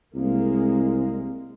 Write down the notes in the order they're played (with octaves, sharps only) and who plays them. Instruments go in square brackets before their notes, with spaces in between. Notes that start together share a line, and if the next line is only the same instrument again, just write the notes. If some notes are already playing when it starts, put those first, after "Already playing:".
[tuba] C2 [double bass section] G#3 A#3